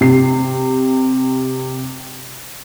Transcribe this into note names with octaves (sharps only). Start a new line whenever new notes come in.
C3 C7